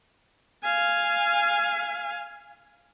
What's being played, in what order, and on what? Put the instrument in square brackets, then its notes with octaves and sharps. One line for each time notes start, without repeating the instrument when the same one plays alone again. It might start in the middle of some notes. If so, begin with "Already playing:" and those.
[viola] F5 G#5